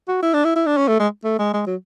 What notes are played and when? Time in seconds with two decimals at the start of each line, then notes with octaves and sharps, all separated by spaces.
0.08 F#4
0.22 E4
0.33 D4
0.44 E4
0.55 E4
0.66 D4
0.77 C#4
0.88 A3
0.99 G#3
1.24 A3
1.38 G#3
1.53 G#3
1.66 F#3